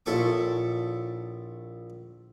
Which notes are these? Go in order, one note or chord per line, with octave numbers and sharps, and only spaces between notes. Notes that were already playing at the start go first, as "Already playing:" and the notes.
A#1 E4 A4 C#5 C#6 D6